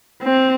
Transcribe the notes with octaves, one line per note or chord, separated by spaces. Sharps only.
C4